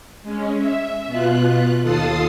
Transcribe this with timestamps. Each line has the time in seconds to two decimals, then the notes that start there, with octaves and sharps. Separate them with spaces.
0.23 G#3 C#4
0.57 E5
1.07 B2 B3 F4 F#6
1.81 D#2 F4 A4 D#6 A6 C7